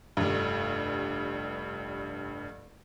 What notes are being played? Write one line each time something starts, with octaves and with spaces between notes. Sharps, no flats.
F1 G2